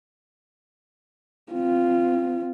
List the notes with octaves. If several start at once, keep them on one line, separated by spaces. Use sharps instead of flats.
C4 F4